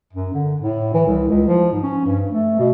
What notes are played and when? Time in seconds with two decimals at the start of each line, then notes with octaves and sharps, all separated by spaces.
0.13 F#2
0.33 D3
0.60 A2
0.94 E3
1.06 C2
1.29 C#2
1.48 F3
1.72 G#2
1.83 C#4
2.05 G2
2.28 A3
2.59 B2